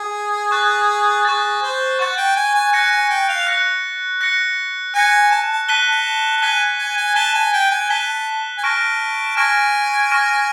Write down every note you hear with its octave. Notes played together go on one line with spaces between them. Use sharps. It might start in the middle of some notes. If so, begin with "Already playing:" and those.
Already playing: G#4
C#6 F#6 A6
G#4 C#6 F#6 A6
C5
F#5 C#6 F#6 A6
G5
G#5
G#5
G#5 F#6 A#6 C#7
G#5
G5
F5
F#6 A#6 C#7
F#6 A#6 C#7
G#5 F#6 A#6 C#7
A5
A5
A5 F#6 B6 D#7 G7
A5
A5
G#5 F#6 B6 D#7 G7
G#5
G#5
A5 F#6 B6 D#7 G7
G#5
G5
G#5
A5 F#6 B6 D#7 G7
G#5
A5 C#6 F6 A#6 D7
G#5 C#6 F6 A#6 D7
C#6 F6 A#6 D7